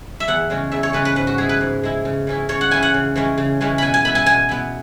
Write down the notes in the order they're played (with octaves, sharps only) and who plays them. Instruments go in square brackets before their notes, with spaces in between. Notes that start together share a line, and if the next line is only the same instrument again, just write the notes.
[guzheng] E5
E2 F#5
C#3 G#3 C#4
E2 E5
C#5
C#3 G#3 C#4 B4
B4
G#2 B4
F#4
G#3 E4 G#4
B4
G#2
G#3 E4
C#3
E3 C#4 E4
C#3 C#5
F#5
E3 C#4 E4 G#5
F#5
C#3
E3 G#3 C#4
C#3
E3 G#3 C#4
B2 G#5 B5
G#5
B3 E4 B5
G#5
B2 G#5
B3 E4